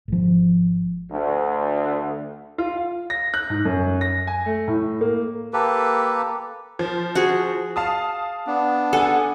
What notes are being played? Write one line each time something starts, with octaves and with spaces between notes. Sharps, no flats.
G#1 F3
D2
F4
F5
A#6
F#6
G#2
F#2
A#6
G#5
A3
A2
A#3
A#3 G4 A4 B4
F3
F#4 G#4
F5 A5 D#6
B3 D4
A4 F#5 G#5